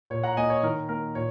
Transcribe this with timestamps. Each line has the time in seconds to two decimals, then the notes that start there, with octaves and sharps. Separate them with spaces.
0.10 A#2 C#5
0.23 F#5 A#5
0.37 A#3 D#5 G#5
0.50 C#5
0.63 D#3 A#4
0.89 A#3 A#4
1.15 A#2 C#5